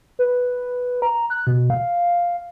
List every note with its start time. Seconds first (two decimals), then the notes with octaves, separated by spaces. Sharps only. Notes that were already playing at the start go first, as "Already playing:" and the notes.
0.19 B4
1.02 A#5
1.30 F#6
1.47 B2
1.70 F5